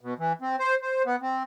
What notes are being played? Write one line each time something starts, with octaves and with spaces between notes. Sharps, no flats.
B2
E3
C4
C5
C5
B3
C4